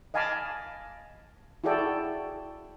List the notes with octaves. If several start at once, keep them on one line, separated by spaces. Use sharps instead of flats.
D#5 F5 G#5 A5 B5 D6
E4 F#4 G#4 A4 D5 G5